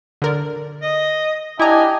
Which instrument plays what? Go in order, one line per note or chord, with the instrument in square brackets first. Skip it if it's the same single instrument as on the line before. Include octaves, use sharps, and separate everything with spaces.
[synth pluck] D3 A#4 D5
[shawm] D#5
[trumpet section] D4 G4 D#5 [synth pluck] E4 A#5 [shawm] G#5